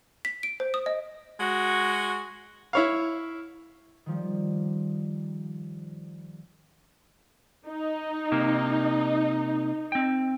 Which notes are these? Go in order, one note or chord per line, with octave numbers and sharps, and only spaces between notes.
B6
D7
C5
D#6
D#5
G#3 F#4
E4 C#5 F5
D#3 F3 G3
D#4
C3 A#3
C4 G5